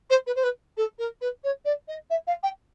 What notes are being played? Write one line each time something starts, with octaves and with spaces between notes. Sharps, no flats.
C5
B4
C5
B4
A4
A#4
B4
C#5
D5
D#5
E5
F5
G5